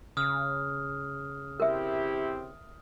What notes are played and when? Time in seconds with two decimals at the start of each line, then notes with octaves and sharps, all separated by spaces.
0.17 C#3 D#6 F6
1.60 C4 E4 G4 A#4 E5